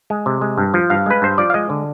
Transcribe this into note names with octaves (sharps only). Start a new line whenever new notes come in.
G#3
C3
G#3
G2
F3
G2 F5
G#3 B4
G2 C5
F3 D5
F5
G#3 D#5
D3